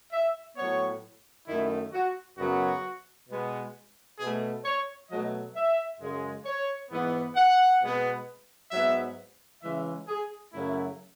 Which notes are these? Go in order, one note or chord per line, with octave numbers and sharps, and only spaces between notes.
E5
A2 F#3 B3 C#5
F#2 D#3 A3 E4
F#4
F#2 C#3 F#3 B3 F#4
B2 G#3 B3
B2 A3 G#4
C#5
B2 F#3 A3 D#5
E5
F#2 C#3 G#3
C#5
G#2 E3 B3
F#5
B2 G#3 B3
G#2 F#3 B3 E5
C#3 E3 G#3 E5
G#4
F#2 C#3 F#3 A3 E4